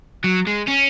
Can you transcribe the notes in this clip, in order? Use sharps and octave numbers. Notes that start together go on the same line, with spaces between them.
F#3
G#3
C#4